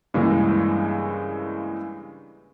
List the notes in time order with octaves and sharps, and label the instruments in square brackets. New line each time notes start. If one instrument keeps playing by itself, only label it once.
[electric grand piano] G2 C#3 E3 G#3 A#3